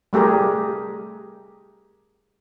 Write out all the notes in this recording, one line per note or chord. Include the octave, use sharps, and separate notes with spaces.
G3 A3 G4 G#4 A#4